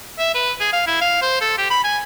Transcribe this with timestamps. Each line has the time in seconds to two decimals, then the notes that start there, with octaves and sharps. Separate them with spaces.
0.18 E5
0.34 B4
0.60 G#4
0.73 F5
0.87 E4
1.01 F5
1.22 C5
1.41 A4
1.58 G4
1.70 B5
1.84 G#5